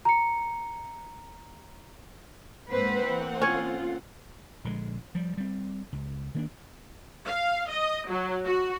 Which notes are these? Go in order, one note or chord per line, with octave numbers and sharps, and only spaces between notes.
A#5 C#7
G#2 A#3 C4 B4 C5 F#5
E3
C#4 F4 C#5
A#1 D3 E3 G#3
F3 G3
G3 C4
C#2
D#3 A#3 D4
F5
D#5
F#3
F#4